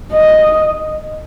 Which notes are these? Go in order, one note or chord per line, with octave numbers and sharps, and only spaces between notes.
D#5